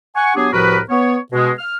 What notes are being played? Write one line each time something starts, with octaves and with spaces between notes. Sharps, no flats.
F#5 G#5 C#6
F#3 B3 D4 G4 G#4
C2 A2 F3 F#4 A#4 B4
B3 C#5
B2 G#3
F6